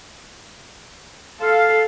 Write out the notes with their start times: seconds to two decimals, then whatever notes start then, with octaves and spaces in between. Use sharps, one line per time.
1.41 A4 F5